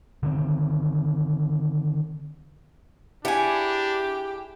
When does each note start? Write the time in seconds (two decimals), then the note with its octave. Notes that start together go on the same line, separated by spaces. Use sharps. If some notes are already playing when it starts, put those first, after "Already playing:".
0.23 D3 D#3 C4
3.25 D4 E4 G4 G#4 F#5 G#5